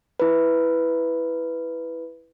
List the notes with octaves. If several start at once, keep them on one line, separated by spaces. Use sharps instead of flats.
E4 B4